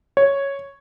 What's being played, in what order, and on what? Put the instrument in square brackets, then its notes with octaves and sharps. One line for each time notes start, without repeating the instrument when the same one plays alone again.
[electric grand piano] C#5